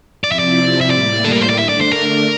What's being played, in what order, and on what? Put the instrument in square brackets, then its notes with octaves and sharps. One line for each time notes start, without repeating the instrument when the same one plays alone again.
[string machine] C3 F3 C4 E4 [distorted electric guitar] D5
[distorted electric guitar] E5
D5
E5
[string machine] A2 G3 A#3 E4 [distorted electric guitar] D5
[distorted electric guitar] A4
A#4
C5
D5
[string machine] D3 A3 D4 [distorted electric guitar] E5
[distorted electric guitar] D5
C5
A#4